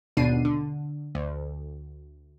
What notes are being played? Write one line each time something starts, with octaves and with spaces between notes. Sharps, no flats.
G#1 D#2 B2 D4 C7 D#7
D3
D2